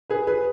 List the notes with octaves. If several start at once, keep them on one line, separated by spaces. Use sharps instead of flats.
G#4 B4
G#4 B4